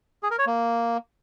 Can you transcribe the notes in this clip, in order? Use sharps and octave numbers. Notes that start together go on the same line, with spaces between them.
G#4
A#4
C#5
A#3